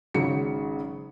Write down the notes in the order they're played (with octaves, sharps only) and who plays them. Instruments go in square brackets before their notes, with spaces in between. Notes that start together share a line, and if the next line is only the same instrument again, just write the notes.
[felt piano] G#1 C#3 F#3 C#7